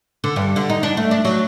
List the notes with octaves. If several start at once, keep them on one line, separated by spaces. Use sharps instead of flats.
D3
G2
D3
D#4
D4
A3
D4
F#3